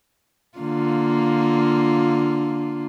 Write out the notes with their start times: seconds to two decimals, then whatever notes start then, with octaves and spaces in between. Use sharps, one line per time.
0.58 D3 A#3 F4